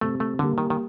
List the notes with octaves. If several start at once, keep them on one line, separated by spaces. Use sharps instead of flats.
C3 A3
A3
D3 G3 A#3
D#3
D#3